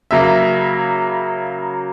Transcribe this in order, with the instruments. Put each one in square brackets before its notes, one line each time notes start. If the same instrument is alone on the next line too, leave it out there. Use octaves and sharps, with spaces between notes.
[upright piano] C#3 F#3 A#3 E5